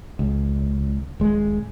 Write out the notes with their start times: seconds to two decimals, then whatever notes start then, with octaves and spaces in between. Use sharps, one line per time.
0.19 C#2
1.20 D#1 G#3